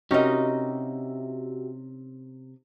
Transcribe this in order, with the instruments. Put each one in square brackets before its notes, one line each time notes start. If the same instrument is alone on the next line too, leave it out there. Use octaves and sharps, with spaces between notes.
[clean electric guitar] C3 [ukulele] C#4 D#5 [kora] D#4 A#4 [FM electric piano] F#4 G4 E5